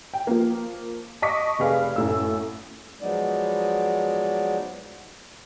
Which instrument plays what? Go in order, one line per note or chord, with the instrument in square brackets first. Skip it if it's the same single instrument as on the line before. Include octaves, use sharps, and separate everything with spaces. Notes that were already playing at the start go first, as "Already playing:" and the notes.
[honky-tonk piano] G5
F3 A#3
D#5 A5 C#6 D6 B6
F1 G#4 B4 F5
F#2 A2 E6
[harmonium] F3 F#3 G#3 B3 D#4 D5